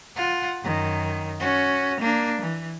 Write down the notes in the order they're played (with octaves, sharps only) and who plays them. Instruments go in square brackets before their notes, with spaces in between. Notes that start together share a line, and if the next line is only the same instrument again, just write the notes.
[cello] F4 F#5
F#2 D#3
C#4 F#4
A#3 D4
E3